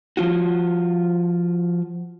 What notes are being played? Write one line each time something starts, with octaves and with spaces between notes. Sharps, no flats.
F3 F4 F#4